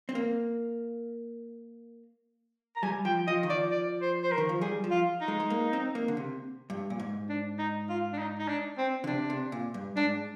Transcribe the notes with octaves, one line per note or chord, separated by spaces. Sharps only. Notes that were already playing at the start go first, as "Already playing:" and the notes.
C4
A#3
A#5
G3 G#5
F3 G5
F3 D#5
D#3
F3 D5
D5
C5
C5
A#4
D#3
F3
G3 G#4
F3
F4
D#4
G#3
G#3
A#3
C4
A#3
D3
C3
G2
A#2
G#2
D4
D#4
F4
D4
D#4
D#4
D4
C4
D3
C3 D4
C3
A#2
G2
G#2 D4